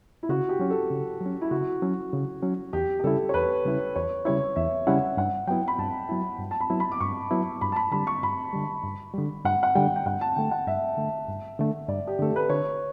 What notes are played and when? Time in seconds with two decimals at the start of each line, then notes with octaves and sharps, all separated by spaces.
0.23 E4
0.29 C#3 F#4
0.49 G4
0.60 F#3 C#4
0.70 A4
0.90 C#3
1.21 F#3
1.26 C#4
1.41 E4
1.51 C#3 F#4
1.82 F#3 C#4
2.13 C#3
2.43 F#3 C#4
2.73 E2 G4
3.00 G4
3.04 C#3 G3 C#4 E4 A4
3.29 C#5
3.34 E2 B4
3.65 C#3 G3 C#4 E4
3.96 E2 C#5
4.25 C#3 G3 C#4 E4 C#5
4.56 E2 E5
4.87 C#3 G3 C#4 E4 F#5
5.17 G2 F#5
5.47 F#3 B3 E4 G5
5.68 B5
5.78 G2 A5
6.09 F#3 B3 E4
6.39 G2
6.51 A5
6.60 B5
6.70 F#3 B3 E4
6.80 B5
6.92 D6
7.00 G2 C#6
7.31 F#3 B3 E4
7.61 G2 B5
7.72 A5
7.76 B5
7.92 D3 G3 B5
8.07 C#6
8.23 G2 B5
8.53 D3 G3
8.84 G2
9.14 D3 G3
9.44 G2 F#5
9.63 F#5
9.75 D3 G3 G5
9.96 G5
10.06 G2 F#5
10.21 A5
10.36 D3 A3 G5
10.51 F#5
10.67 G2 E5
10.97 D3 A3
11.28 G2
11.59 D3 A3
11.88 G2 D5
12.07 G4
12.19 D3 A3 A4
12.36 B4
12.50 D3 C#5